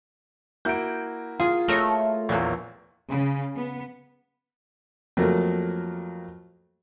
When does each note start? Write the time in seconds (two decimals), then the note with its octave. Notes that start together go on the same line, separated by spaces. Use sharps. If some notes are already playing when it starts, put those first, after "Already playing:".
0.65 A#3 E4 F#4 G6 D7
1.40 F4 G#4
1.68 A3 A#4 C#5 D#5
2.29 A#1 E2 A#2 F#3
3.07 C#3
3.55 B3
5.17 F2 F#3 A3 A#3